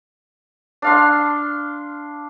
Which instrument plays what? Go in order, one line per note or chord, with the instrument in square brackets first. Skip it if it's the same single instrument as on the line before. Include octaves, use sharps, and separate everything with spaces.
[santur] D4 F5 C6